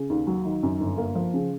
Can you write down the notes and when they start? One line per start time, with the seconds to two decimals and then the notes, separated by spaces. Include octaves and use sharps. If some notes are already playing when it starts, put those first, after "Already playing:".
Already playing: C#3
0.10 D#2
0.27 F#3
0.45 D#3
0.63 F#2
0.80 G1
0.98 A#3
1.15 F3
1.34 C#3